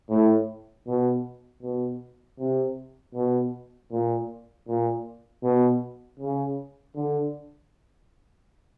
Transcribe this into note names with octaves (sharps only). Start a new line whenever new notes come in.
A2
B2
B2
C3
B2
A#2
A#2
B2
C#3
D3